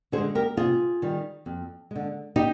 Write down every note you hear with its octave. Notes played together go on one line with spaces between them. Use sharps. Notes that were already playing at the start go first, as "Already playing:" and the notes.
D3 G#4 C5
G#3
G4 A#4
C3 F4 G#4
D#3 G3
F2
D3 G#3
D#4 G4